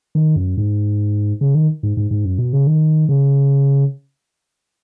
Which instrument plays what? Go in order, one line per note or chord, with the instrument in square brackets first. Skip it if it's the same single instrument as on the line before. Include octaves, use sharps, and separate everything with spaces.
[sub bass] D#3
F#2
G#2
C#3
D#3
G#2
G#2
G#2
F#2
B2
C#3
D#3
C#3